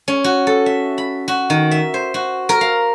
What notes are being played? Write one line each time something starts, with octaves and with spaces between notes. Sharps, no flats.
C#4
F#4
A4
E5
B5
F#4
D#3
E5
C5
F#4
A#4
F5